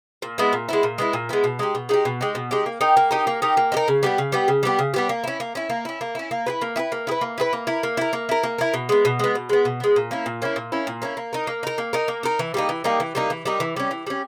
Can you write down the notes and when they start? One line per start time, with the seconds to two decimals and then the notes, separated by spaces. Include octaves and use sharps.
0.22 A#2
0.38 G#3 B3 E4
0.53 A#2
0.69 G#3 B3 E4
0.83 A#2
0.98 G#3 B3 E4
1.13 A#2
1.29 G#3 B3 E4
1.44 B2
1.59 G#3 D#4 G4
1.75 B2
1.89 G#3 D#4 G4
2.05 B2
2.21 G#3 D#4 G4
2.35 B2
2.51 G#3 D#4 G4
2.66 A#3
2.81 D#4 G4 A#4
2.97 A#3
3.11 D#4 G4 A#4
3.27 A#3
3.42 D#4 G4 A#4
3.57 A#3
3.72 D#4 G4
3.77 A#4
3.88 C#3
4.03 G3 B3 G4
4.18 C#3
4.32 G3 B3 G4
4.48 C#3
4.63 G3 B3 G4
4.79 C#3
4.94 G3 B3 G4
5.09 A#3
5.24 C#4 E4
5.40 A#3
5.55 C#4 E4
5.70 A#3
5.85 C#4 E4
6.01 A#3
6.15 C#4 E4
6.31 A#3
6.46 E4 G#4 B4
6.62 A#3
6.76 E4 G#4 B4
6.92 A#3
7.07 E4 G#4
7.11 B4
7.21 A#3
7.38 E4 G#4 B4
7.53 A#3
7.67 E4 A#4
7.83 A#3
7.97 E4 A#4
8.13 A#3
8.29 E4 A#4
8.43 A#3
8.58 E4 A#4
8.74 B2
8.89 G#3 B3
9.05 B2
9.19 G#3 B3
9.35 B2
9.49 G#3 B3
9.65 B2
9.80 G#3 B3
9.96 A#2
10.11 A#3 C#4 E4
10.26 A#2
10.42 A#3 C#4 E4
10.56 A#2
10.72 A#3 C#4 E4
10.87 A#2
11.02 A#3 C#4 E4
11.17 A#3
11.33 D#4 A#4
11.47 A#3
11.63 D#4 A#4
11.78 A#3
11.93 D#4 A#4
12.08 A#3
12.23 D#4 A#4
12.39 E3
12.54 G3 A#3 D#4
12.69 E3
12.84 G3 A#3 D#4
13.00 E3
13.15 G3 A#3 D#4
13.30 E3
13.45 G3 A#3 D#4
13.60 E3
13.76 G3 C#4
13.91 E3
14.07 G3 C#4